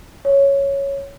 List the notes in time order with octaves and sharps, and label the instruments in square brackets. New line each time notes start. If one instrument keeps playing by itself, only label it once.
[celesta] C#5